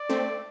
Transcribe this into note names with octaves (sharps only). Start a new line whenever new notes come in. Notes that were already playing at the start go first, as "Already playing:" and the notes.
Already playing: D5
A3 C4